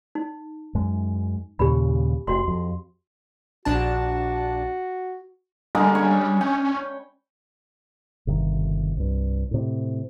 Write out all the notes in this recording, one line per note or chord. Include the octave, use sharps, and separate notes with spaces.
D#4
F#2 G#3
D#2 A#2 C#3 G4 B5
F1 F#4 F#5 C6
F2
A#1 D4 F#4 A5
D3 G3 G#3 A#3
C#4 B4 C#5
C#4 G5
G1 C3 D#3
C2 G2
A2 C3